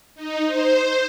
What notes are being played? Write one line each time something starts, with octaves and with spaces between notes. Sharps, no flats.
D#4
C5